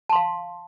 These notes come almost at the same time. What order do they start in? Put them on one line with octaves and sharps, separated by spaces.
A5 C6 F5